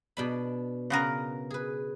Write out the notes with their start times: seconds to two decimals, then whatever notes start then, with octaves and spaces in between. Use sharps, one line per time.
0.17 B2 D4 B5
0.90 C#3 B3 A#4
1.50 G#4 B4